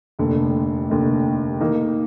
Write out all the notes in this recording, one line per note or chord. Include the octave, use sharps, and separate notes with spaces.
F1 D#2 D3
F1 D#2 D3
D#3 A#3 D#4